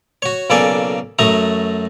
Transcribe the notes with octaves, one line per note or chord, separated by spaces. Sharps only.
F#4 C#5
B1 C#3 A#3 A4 D5 G#5
F#2 F#3 A3 A#5 C#6 D#6